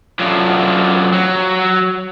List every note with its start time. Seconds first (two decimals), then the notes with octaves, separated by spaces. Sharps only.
0.19 F#2 F3 F#3 A3 D4 F4
1.12 F#3